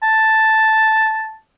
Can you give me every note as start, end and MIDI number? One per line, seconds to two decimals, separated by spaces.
0.03 1.35 81